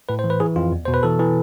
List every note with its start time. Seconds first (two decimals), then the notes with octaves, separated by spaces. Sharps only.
0.09 A2 B4
0.19 C5
0.24 E3
0.30 B4
0.40 E3 G#4
0.56 F2 F4
0.72 E2
0.85 B2 C5
0.94 B4
1.03 E3 A4
1.20 E3